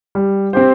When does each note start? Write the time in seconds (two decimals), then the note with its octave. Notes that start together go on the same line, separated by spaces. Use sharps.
0.15 G3
0.53 C4 G4 C5